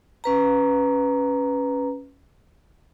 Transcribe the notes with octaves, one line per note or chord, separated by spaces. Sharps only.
C#4 B4 A#5